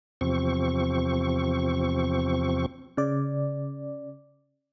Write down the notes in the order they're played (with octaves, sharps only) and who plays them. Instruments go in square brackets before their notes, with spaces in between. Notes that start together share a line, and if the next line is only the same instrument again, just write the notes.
[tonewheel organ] E2 C3 F3 C4 C#6
[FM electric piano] C#3 D5